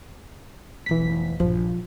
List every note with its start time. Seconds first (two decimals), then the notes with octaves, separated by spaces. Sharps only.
0.86 F1 B1 E3 B6
1.40 A#1 G2 F3